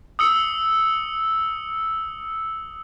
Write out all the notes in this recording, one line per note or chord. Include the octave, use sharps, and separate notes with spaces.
D#6 E6 C#7